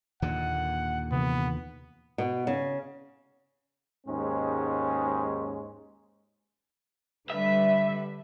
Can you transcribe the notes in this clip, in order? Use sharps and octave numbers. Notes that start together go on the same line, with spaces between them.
D#2 A#2 D3 F#5
C3 E3 B3
B2
C#3
D#2 G#2 G#3 C#4
D3 G3 B4 E5